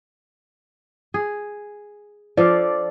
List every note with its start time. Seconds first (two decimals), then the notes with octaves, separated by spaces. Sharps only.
1.14 G#4
2.37 F3 A4 D5 F5